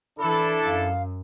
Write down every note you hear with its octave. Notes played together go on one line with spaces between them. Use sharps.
E3 D4 E4 A4 B5
F#2 F5